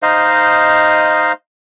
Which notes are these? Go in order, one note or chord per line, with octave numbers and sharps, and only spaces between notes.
D#4 C5 D#5 F5